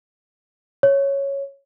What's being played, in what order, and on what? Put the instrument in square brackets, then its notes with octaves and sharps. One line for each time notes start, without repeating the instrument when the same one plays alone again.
[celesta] C#5